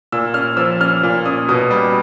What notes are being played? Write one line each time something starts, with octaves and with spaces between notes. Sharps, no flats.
A#2 E6
C#4 F6
F3 E6
C#4 F6
A#2
C#4 D#6
B2 D#6
G3